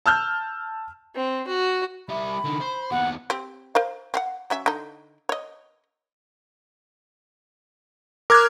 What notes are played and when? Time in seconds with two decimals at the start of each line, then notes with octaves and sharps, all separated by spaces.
0.06 A5 E6 F6 G6
1.15 C4
1.47 F#4
2.09 G3 E5 B5
2.44 D3 D#4
2.60 C5
2.91 D#2 B3 F#5
3.30 C4 G4
3.75 A#4 C5 F5
4.14 C4 F5 F#5
4.50 F#3 C#4 E5
4.66 D3 D#4
5.29 C#5 D#5
8.30 A#4 D6 F6 F#6 G#6